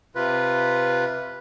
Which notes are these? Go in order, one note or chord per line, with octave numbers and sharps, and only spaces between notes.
C3 F4 B4